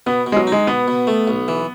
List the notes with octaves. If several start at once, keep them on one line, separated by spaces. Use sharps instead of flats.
B2 B3
B2
G#3
F#3
G#3 D#4
B2 B3
B2
A3
B1
E3